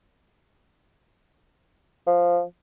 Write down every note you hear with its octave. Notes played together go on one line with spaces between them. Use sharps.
F3